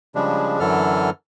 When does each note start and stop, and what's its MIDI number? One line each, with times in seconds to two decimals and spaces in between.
0.15 0.60 49
0.15 0.60 53
0.15 0.60 55
0.15 0.60 56
0.15 0.60 62
0.60 1.10 42
0.60 1.10 50
0.60 1.10 52
0.60 1.10 54
0.60 1.10 69
0.60 1.10 89